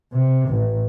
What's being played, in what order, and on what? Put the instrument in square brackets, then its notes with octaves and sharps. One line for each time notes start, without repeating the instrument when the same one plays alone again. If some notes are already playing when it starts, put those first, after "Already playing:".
[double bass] C3
A1